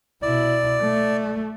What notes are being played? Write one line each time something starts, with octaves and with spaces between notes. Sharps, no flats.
B2 E4 D5
A3